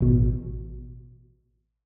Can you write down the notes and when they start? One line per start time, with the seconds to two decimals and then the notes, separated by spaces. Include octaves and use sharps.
0.01 A1 B2